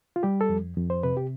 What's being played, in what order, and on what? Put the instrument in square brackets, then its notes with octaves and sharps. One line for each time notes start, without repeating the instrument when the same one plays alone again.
[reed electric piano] F4
G3 G4
A4
F2
F2
C5
C3 B4
G4